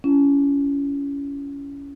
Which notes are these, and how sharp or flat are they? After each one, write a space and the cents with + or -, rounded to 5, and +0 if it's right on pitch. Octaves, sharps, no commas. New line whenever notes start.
C#4 +20 E4 +45